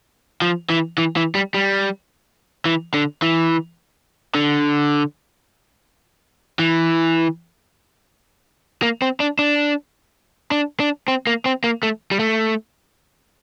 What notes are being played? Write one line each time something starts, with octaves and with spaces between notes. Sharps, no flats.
F3
E3
E3
E3
G3
G3
E3
D3
E3
D3
E3
A#3
C4
D4
D4
D4
D4
C4
A#3
C4
A#3
A3
G3
A3